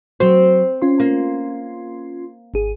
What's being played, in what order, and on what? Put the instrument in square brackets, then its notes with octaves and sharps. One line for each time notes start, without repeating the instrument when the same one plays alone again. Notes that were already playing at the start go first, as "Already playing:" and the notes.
[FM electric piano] F#3 F#4 [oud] C4
[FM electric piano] C#4 F4 C6
[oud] A#3
[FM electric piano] G#1 G#4